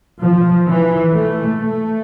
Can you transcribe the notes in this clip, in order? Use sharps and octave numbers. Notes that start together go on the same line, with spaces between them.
F3
E3
A3
A3